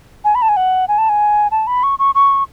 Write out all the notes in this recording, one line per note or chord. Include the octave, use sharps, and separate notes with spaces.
G#5
B5
A5
G#5
F#5
G#5
A5
G#5
A5
B5
C#6
C#6
C#6